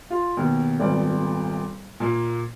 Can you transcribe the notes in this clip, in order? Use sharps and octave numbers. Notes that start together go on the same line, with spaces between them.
F4
D#2 B2
D#1 G#1 B3 D5
A#2 A#3